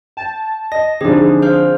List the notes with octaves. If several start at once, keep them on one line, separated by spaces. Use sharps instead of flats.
G5 A5
D#5 A#6
D3 F3 C4 D4 D#4 G4 G#4
C5 F5 F6